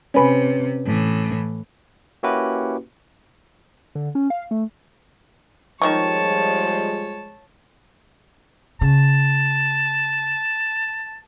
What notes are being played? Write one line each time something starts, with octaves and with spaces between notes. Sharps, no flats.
C3 C#4 B4
A2 E3
A#3 C#4 E4 F#4 G4 B4
D3
C#4
F5
A3
D#3 F3 G3 G#3 C#5 A5 C#6
C#3 A5